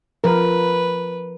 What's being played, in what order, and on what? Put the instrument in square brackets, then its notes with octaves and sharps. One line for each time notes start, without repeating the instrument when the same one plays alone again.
[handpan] F3 A#4 [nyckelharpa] B4